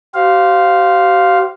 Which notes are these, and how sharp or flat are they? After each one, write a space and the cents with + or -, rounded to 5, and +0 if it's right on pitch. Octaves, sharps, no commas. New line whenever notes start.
G4 -40 C5 +0 F5 +0